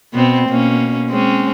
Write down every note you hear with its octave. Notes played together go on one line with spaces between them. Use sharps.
B2 B3 C4
B2 A#3 C#4
G#3 C4 C#4